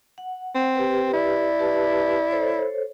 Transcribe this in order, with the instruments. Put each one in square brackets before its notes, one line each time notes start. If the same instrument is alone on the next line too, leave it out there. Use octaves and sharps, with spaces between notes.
[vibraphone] F#5
[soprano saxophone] C4
[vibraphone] G4 B4
[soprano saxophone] E4 [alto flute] D5
[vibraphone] G4 B4 A5
A4 C5 C#5